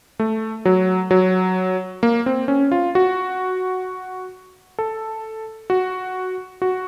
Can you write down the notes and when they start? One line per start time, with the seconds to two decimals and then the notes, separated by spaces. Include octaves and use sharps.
0.20 A3
0.65 F#3
1.11 F#3
2.03 A#3
2.26 C4
2.48 C#4
2.72 F4
2.95 F#4
4.79 A4
5.70 F#4
6.62 F#4